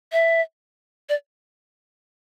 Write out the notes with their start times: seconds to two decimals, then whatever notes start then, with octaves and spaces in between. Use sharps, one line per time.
0.12 E5
1.09 D5